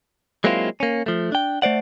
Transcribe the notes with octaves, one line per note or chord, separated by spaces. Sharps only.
F#3 G#3 A#3 C4 E4 F4
A#3 C#4
F3 A3
D4 G5
A3 C5 D5 F#5